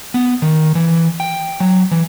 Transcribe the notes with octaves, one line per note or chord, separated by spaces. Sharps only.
B3
D#3
E3
G5
F#3
E3